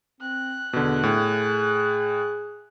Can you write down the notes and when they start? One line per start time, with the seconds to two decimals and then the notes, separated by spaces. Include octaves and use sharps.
0.21 C4 F#6
0.73 E2 B2 D3
1.03 A2 G#4